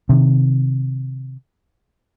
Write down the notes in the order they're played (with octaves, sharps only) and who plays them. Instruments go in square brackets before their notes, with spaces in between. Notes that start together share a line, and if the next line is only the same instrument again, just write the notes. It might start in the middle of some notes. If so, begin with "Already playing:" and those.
[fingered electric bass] C3 D#3